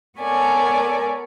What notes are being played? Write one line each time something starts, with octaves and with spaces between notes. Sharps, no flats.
B3 A4 A#4 C#5 D5 G#5